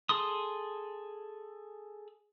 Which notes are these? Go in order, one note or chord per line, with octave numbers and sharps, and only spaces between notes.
G#4 A4 C6 D#6